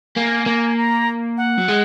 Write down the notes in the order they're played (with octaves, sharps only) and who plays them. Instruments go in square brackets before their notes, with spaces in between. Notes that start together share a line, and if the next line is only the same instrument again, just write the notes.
[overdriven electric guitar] A#3 [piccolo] G#5
[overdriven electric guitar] A#3
[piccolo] A#5
F#5
[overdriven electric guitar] F#3
G#3